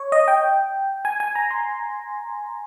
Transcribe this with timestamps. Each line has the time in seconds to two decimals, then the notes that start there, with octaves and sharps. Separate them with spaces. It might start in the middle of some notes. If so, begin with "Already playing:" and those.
Already playing: C#5
0.12 D#5
0.28 G5
1.05 G#5
1.20 G#5
1.35 A#5
1.51 C6